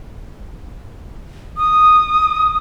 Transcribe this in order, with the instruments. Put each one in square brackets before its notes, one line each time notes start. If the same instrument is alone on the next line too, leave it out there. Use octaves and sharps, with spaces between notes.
[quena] D#6